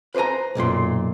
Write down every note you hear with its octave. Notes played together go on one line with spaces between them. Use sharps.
B4 C5 D5 G#5 A#5
B1 F#2 A#2 C6